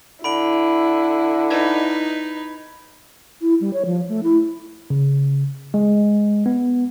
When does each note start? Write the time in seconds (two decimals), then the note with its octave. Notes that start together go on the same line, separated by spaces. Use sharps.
0.24 D3 E4 B5 D7 F#7
1.50 D#4 B4 G#6
3.41 E4
3.61 G3
3.73 C#5
3.86 F3
4.09 A3
4.23 E4
4.90 C#3
5.74 G#3
6.46 B3